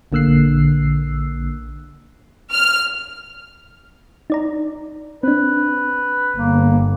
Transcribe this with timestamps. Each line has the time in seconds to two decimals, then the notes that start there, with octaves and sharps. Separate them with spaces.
0.12 A#1 D3 A#3 E6 F#6 C7
2.52 F6
4.30 D#4 D5 A#5
5.23 C4 D4 B4
6.37 G1 A#3